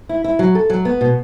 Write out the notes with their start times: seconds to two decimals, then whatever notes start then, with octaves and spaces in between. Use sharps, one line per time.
0.09 E4
0.24 E4
0.39 F#3
0.55 A4
0.70 F#3
0.85 B3
1.01 B2